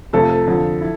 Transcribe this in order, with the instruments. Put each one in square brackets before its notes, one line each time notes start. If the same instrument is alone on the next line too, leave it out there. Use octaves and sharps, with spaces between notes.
[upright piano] F2 C3 F3 A3 [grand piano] A4
[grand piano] A4
[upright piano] F2 D3 F3
E4